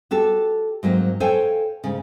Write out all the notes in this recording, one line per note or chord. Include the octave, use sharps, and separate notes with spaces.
F#4 G4 A4
G#2 F#3 A#3 C4
A4 C5 C#5 F5 G5 G#5
G#2 C#3